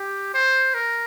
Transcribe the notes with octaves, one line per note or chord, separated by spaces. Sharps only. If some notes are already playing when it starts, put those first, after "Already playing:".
Already playing: G4
C5
A#4